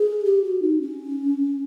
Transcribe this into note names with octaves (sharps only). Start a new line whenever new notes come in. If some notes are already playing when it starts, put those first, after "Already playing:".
Already playing: G#4
G4
F#4
D#4
C#4